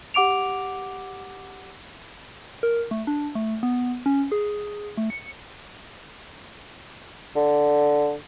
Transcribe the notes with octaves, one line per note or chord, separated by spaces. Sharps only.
G4 F#5 D6 D7 F7
A#4
A3
D4
A3
B3
C#4
G#4
A3
C#7
D3